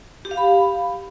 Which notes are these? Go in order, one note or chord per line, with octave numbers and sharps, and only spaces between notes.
G4
F5
B5